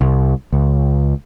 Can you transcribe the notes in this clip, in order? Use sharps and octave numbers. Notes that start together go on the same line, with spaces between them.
C2
C#2